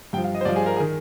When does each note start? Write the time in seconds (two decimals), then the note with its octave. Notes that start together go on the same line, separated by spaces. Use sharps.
0.13 G2 G5
0.17 F3
0.24 F5
0.34 D#5
0.41 C5
0.45 G2 D5
0.48 F3
0.56 G#4
0.62 C5
0.66 A#4
0.76 G#4
0.80 D#3